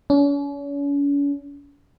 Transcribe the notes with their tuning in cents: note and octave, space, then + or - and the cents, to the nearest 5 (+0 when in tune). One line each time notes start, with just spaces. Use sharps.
C#4 +40